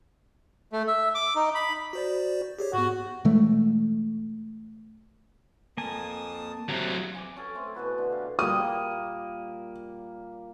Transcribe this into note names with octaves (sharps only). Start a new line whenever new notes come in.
A3
E5
D6
D#4
B5
F#4 C5 D5
G4 G#4 C#5
G#2 B3 F#4
B2 E3 G#3 A3
F2 A#3 G#5 A5 D#6
C3 F#3 C4
G#5 D6
C#4 A4 G#5
A3 C4
B2 E3 F#4 B4
D3
G4 F5
A#2 G3 A#3 D#6